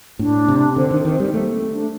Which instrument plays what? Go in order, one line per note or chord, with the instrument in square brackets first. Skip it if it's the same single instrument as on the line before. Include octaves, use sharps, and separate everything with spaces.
[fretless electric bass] A2 [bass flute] D4
[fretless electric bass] C3
[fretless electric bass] D3 [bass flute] C4
[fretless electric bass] D#3
D#3
G3
[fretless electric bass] A3 [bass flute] A#3
[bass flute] C4
D4